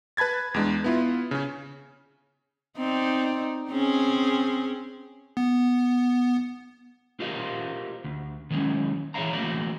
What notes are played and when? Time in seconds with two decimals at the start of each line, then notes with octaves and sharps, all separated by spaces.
0.17 B4 A5 B5 G#6 A6
0.54 E2 G#3 D4
0.84 B3 E4 F4
1.31 C#3 C#4
2.77 C4 D#4 D5
3.69 C4 C#4 G#4
5.37 B3
7.20 F4 G4 A#4 C5 D#5 F5
8.04 D2
8.50 D#3 F#3 G#3 C#4
9.14 E3 G#4 C#5 E5 F5 A#5
9.33 E3 A3 A#3 F#4 D5